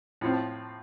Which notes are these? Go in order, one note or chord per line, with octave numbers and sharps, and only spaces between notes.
A2 F3 C4 F4